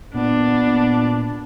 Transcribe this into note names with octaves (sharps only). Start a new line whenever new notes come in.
A#2 B3 D4